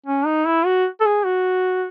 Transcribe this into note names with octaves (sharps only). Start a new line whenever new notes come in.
C#4
D#4
E4
F#4
A4
G#4
F#4